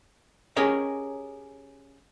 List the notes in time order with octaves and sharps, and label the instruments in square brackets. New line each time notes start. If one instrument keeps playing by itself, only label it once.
[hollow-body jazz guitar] C#4 G4 G#4 A#4 C#5 D#5